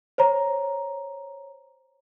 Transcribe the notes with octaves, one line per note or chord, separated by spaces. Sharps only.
C5 C#5 A#5